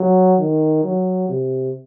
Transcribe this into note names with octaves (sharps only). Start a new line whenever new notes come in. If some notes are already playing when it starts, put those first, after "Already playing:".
Already playing: F#3
D#3
F#3
C3